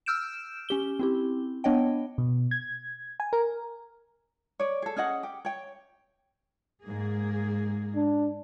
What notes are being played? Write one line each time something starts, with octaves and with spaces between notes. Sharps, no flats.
E6 F6 G6 D7 E7
C#4 G4 G7
C4 E4 G4
B3 D4 C#5 D#5 G5
B2
G#6
G#5
A#4
C#5 D5
G#4 A4
C#4 G#4 D#5 F#5
G4
C#5 G5
G#2 A#3 G#4
D4